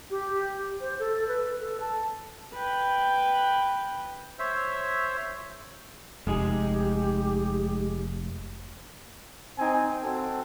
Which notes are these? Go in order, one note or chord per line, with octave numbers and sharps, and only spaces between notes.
G4
C5
A4
B4
A4
A5
B4 G5
C5 C#5 E5
F1 G#3 D#4 G4 G#4
C4 D#4 G#5
C4 F#4 A4